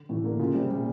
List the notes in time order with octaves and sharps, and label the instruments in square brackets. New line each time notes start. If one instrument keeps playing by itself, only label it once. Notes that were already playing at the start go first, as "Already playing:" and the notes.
Already playing: [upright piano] D3
[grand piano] A2 [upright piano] E3
[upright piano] D3 [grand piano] A#3
[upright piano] C#3 [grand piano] F4
[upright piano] C3 [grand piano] G3
[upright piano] A#2 [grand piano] G3